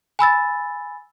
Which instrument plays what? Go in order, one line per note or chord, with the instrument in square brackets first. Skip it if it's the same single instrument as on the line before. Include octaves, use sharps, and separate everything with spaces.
[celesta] G#5 B5 E6 A6